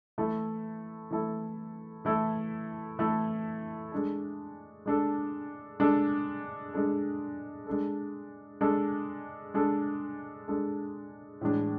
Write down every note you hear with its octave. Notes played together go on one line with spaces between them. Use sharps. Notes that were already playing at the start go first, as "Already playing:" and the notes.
E3 A3 E4 A4
E3 A3 E4 A4
E3 A3 E4 A4
E3 A3 E4 A4
G#3 D4 A4
G#3 D4 A4
G#3 D4 A4
G#3 D4 A4
G#3 D4 A4
G#3 D4 A4
G#3 D4 A4
G#3 D4 A4
A2 E3 G#3 D4